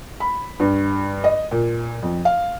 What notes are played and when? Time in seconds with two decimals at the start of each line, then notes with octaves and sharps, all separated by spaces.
0.20 B5
0.60 G2
1.24 D#5
1.51 A#2
2.02 F2
2.25 F5